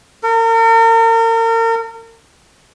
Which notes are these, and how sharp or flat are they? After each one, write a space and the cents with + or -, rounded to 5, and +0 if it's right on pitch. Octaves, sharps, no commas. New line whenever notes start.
A#4 -40